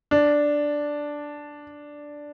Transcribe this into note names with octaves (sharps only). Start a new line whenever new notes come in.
D4